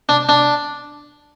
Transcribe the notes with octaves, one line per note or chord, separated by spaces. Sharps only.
D4
D4